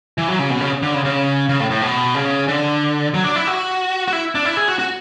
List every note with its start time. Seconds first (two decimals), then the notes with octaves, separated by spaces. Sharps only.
0.18 E3
0.28 F#3
0.39 C#3
0.50 B2
0.60 C#3
0.82 D3
0.94 C#3
1.05 C#3
1.49 C#3
1.60 A2
1.70 A2
1.82 B2
2.15 C#3
2.48 D3
3.14 F#3
3.24 D4
3.36 E4
3.47 F#4
4.08 F#4
4.13 E4
4.35 D4
4.45 E4
4.57 G#4
4.68 F#4
4.79 F#4